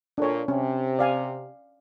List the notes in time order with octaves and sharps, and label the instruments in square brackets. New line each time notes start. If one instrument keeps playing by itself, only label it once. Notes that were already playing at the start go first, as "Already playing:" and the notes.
[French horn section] A#2 A4 [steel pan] D4 C#5
[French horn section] C3 [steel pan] C#4
[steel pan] D5 F5 G#5